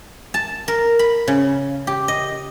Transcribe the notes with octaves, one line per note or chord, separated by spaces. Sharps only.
A5
A#4
B5
C#3
G4
D#5